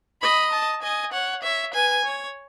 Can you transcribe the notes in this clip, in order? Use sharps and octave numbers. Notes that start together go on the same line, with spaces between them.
D#5 B5
A5
D#5 G#5
C#5 F#5
C#5 E5
B4 G#5
C#5